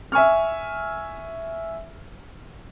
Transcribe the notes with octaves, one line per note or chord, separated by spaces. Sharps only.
E5 G#5 C#6 F6